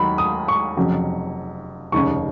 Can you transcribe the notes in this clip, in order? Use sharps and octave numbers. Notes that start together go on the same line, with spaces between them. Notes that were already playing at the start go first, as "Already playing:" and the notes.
Already playing: D#2 D#3 F#3 B5
D#6
C#6
F1 F2 C#3 F#3
F1 D#2 C#3 C#6